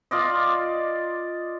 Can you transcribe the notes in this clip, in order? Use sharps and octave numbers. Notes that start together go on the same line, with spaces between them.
F4 D5 D#5